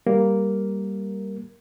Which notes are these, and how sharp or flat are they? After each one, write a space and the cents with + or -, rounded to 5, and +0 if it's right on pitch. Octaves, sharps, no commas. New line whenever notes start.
G3 +0 A#3 +0 A#4 +0